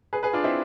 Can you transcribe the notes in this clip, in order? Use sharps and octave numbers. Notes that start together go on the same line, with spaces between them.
G#4 B4
G#4 B4
D4 F4
C4 E4